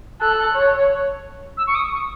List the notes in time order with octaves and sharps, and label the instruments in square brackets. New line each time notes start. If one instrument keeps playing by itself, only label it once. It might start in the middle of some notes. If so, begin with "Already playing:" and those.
[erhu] A4 [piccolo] F#6
[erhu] C#5
[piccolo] E6
C#6
D#6
C#6